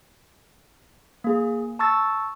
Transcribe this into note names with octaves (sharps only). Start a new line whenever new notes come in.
A#3 G#4
A5 C#6 E6 A6